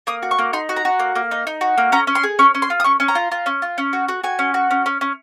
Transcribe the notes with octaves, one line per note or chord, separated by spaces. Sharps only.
A#3 D#6
F#4
C#6
A#3
D#4 C6
F#4
A#5
F#4
A#3
A#3
D#4
D#4
F#4
A#3
C#4 A#5
C#4
C6
G#4
C#4 C#6
C#4
C6
F4
D#6
C#4 C#6
C#4
A#5
F4
F4
C#4
F4
C#4
F#4
F#4
F#4 G#5
C#4
F#4
C#4
C#4
C#4